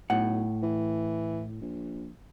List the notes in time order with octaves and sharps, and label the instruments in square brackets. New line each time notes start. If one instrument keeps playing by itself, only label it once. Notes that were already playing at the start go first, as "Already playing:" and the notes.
[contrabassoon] B1 [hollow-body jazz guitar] A2 F#5
[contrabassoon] E3
A#1